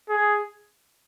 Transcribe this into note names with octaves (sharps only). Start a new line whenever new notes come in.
G#4